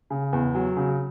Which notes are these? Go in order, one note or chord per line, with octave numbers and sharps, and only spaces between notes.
C#3
E2
F#3
C#3